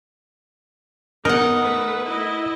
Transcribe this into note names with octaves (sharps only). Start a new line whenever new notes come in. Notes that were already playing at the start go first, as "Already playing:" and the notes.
B3 D#4 A#4 F#5
A3 B4
E4 D#5